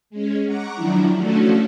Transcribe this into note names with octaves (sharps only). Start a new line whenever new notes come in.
G#3 C#4
F#5 A#5 C#6 D6 F#6
D#3 F3 F#3 D4 E4
F3 A3 C#4 D4 F#4 A4